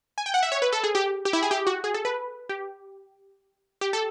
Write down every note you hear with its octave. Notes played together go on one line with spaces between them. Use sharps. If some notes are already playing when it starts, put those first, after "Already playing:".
G#5
G5
F#5
E5
C#5
B4
A4
G#4
G4
G4
E4
G#4
G4
F#4
G#4
A4
B4
G4
G4
A4